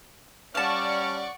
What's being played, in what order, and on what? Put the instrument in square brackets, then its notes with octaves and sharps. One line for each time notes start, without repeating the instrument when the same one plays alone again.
[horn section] G3 C#4 [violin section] D5 F#5 C#6 [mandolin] F5 A5